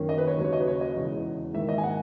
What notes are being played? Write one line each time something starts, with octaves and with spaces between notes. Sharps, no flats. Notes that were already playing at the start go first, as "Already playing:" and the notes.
Already playing: F#2 D#3 A#3 C#4
D#5
B4
C#5
D#2 C#3 F#3
C#5
D#5
B4
C#5
D#5
E1 E2 C#3
G#2 D#3 A#3 E5
D#5
G#5
F#5